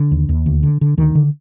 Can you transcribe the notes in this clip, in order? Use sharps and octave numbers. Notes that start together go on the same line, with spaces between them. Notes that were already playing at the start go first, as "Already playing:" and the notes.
Already playing: D3
D#2
D#2
D2
D3
D3
D2 D#3
D3